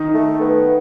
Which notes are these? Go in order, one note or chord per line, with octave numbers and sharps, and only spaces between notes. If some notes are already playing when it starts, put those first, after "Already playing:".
Already playing: D#3 D#4
A3
B3